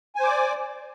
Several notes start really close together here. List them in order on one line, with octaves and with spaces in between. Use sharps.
G#5 C5 D6 D5